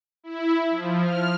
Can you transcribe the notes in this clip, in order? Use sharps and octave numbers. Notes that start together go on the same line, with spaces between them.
E4
F3
F6